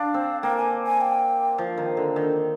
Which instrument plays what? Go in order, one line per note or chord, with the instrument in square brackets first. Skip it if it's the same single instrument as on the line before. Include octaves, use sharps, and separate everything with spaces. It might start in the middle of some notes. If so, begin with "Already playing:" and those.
Already playing: [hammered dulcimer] D4 [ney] F5
[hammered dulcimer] C4
[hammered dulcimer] A#3 [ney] G5
[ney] G#5
G#5
G5
[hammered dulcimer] F3
D#3
D3
D#3